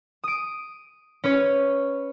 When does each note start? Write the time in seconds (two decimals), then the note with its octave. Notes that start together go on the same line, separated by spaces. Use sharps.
0.24 D#6 D7
1.24 C#4 B4 C#5